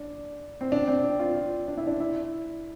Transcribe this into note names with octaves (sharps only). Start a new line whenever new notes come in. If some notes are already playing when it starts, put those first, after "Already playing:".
Already playing: D4
C4
D4
C4
D4
F4
F4
D4
E4
D4
E4